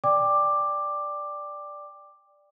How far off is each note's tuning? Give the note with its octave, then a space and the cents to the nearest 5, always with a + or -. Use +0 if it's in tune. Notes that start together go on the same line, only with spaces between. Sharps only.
D5 +0 G5 +20 D6 +10